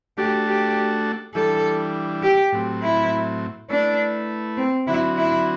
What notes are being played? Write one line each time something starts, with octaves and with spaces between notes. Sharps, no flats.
A3 D4 F#4 G4 A4
G4
E3 G3 D4 A4
G4
A2 F#3 C4
E4
A3 D4 E4 B4
C4
D3 F#3 C4 E4 F#4
E4